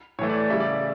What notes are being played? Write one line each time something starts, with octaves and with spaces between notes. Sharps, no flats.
A2 E3 A3 C#5
D5
D5
C#3 G3 E5
D5